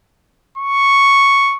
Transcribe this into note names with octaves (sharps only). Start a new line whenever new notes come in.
C#6